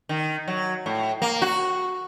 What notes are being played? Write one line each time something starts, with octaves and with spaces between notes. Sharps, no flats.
D#3
F#3
A2
A#3
F#4